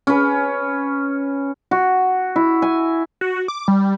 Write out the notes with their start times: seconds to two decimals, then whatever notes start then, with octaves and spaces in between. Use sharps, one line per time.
0.07 C#4 B4
1.71 F#4
2.36 E4
2.62 G#5
3.21 F#4
3.48 D6
3.68 G3